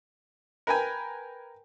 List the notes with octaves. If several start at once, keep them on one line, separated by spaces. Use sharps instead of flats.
A#4 B4 G5 G#5